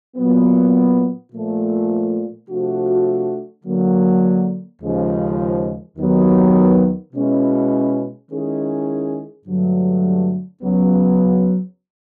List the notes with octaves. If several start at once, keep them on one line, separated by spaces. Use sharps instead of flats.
A#2 F#3 B3
A#2 F3 A3
C3 F3 A3 D4 F#4
D3 F#3 A#3
D#2 C#3 F3 G#3
D#2 D#3 F#3 B3
B2 G#3 C#4 E4
D#3 G#3 C#4 E4 G#4
G2 D3 F#3 A3
C#2 C#3 F#3 B3